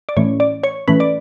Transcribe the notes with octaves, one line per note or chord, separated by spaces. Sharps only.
D5
A2 E3 A3 C#4 C#5
D5
C#5
A2 E3 A3 C#4 B4
D5